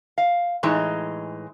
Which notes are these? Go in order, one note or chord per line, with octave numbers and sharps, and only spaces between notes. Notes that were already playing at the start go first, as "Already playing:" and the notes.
F5
A2 E3 G#3 D#4